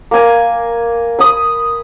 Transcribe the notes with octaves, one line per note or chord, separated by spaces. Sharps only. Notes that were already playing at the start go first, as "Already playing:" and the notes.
A#3 G#5
B5 D#6